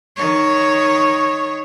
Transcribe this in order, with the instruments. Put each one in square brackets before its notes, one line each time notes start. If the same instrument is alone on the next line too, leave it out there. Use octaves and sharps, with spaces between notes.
[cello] D#3 C#5